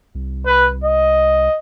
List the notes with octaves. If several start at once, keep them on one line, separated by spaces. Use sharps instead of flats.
C2
B4
D#5